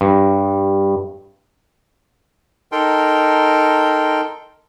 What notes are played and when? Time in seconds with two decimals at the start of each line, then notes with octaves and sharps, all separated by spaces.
0.01 G2
2.72 D#4 A4 A#4 G5 C6